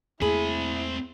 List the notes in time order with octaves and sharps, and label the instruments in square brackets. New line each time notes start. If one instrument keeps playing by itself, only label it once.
[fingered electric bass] E2 A3 A#3 [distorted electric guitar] C4 B5 [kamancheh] E4 [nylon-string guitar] G#4